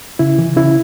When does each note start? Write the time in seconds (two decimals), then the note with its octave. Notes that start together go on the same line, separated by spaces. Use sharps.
0.19 C#3 E4
0.39 E3
0.57 C#3 E4